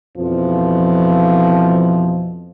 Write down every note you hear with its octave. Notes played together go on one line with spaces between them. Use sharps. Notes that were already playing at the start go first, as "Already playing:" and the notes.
F2 B2 E3 F3